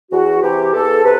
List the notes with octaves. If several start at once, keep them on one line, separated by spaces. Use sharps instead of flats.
E2 F#4
C3 E3 G4
E2 A4
C3 B4